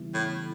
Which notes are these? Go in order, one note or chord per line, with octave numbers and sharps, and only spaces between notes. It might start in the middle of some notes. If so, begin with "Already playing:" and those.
Already playing: C#3 E3 G3 B3 E4
A2